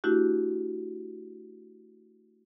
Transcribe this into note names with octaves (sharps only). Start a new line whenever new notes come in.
A3 D4 E4 F#4 G4